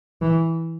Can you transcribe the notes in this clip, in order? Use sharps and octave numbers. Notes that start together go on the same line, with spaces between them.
E3